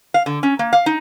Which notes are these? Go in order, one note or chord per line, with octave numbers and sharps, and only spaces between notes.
F5
D3
C#4
A#3
F5
D#4